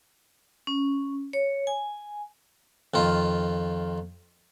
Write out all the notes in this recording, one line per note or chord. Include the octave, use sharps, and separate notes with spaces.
C#4
C#5
G#5
F2 D#3 F4